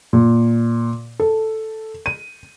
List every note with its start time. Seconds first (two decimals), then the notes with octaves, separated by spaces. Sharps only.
0.13 A#2
1.20 A4
2.06 D#7